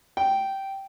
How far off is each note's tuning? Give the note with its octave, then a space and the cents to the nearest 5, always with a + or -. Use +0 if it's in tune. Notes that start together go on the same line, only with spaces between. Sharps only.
G5 -10